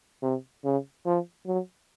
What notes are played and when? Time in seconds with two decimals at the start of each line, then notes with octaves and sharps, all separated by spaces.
0.23 C3
0.65 C#3
1.06 F3
1.47 F#3